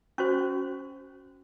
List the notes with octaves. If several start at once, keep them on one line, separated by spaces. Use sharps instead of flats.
C#4 F#4 C5 C#6